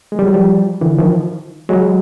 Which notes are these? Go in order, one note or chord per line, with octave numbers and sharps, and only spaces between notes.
G#3
G3
F#3
F3 G3
D3 E3
D#3 F3
F#3 G#3